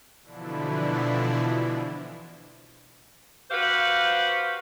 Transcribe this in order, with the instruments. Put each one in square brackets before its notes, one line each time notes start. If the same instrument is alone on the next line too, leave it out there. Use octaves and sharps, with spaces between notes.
[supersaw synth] B2 D3 E3 F3 D4 E4
[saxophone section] F#4 G4 B4 C5 F5